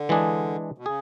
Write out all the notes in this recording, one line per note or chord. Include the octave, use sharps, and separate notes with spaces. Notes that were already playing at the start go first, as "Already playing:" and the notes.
Already playing: D3
E3 G#3 D4 G#4
B2
C#3 G#4